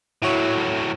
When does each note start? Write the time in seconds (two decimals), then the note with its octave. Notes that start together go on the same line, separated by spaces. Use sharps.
0.22 A2 F#3 E4 F#4 C#5